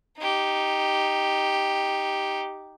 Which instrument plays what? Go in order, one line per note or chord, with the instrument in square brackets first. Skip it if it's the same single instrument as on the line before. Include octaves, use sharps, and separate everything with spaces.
[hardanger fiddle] D#4 G4